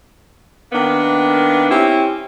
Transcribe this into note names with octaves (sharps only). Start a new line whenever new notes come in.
D#3 A#3 B3 D4
C4 C#4 E4 G4